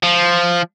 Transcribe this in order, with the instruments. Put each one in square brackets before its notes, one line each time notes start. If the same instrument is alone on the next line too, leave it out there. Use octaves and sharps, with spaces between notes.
[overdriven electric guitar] F3